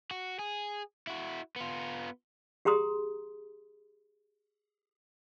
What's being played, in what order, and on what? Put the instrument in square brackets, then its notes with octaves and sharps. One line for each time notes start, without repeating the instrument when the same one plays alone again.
[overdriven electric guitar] F#4
G#4
E4 F#4
B3 F4
[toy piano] G4 G#4 A#5 C6 D#6